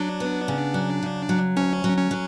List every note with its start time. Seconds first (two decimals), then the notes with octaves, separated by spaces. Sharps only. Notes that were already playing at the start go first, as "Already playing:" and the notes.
Already playing: F#3 D4
0.20 B3
0.48 C#3
0.74 F#3
1.03 C#3
1.29 F#3
1.57 D2 C#4
1.84 F#3
1.98 C#4
2.11 F#3